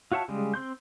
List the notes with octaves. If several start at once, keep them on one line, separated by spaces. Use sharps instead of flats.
F4 F#4 C#5 E5 A5
C#3 G3 G#3
C4 C6 G6